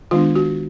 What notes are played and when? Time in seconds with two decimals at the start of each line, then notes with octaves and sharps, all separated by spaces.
0.11 D#3 G#3 B3 D4 F4
0.35 F#4